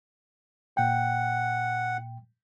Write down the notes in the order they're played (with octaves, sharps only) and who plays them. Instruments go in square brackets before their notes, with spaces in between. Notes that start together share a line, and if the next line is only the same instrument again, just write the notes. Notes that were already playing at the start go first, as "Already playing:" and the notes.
[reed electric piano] A#2 G5 [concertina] F#5